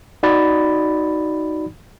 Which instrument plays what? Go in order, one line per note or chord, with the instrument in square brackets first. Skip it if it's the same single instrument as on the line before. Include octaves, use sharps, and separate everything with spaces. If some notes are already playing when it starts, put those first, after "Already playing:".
[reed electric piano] D#4 F#4 D5 B5 A6